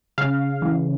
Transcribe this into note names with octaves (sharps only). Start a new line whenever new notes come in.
C#3 F5
E3